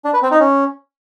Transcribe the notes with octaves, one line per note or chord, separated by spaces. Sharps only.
D4
B4
C4
D#4
C#4